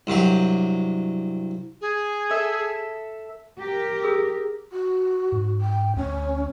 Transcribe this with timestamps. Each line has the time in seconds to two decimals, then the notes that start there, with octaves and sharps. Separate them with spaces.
0.07 C2 G2 F#3 G4
1.81 G#4
2.29 A4 E5
3.59 G4 A#4
4.04 G#4 D#6 E6
4.72 F#4
5.32 G#2
5.61 G5
5.96 D2 C#4